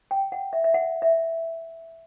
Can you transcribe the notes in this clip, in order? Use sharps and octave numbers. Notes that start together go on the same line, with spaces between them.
G5
F#5
E5
E5
F#5
E5